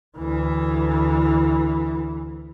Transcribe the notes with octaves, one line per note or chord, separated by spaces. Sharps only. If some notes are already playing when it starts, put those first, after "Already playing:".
D2 E3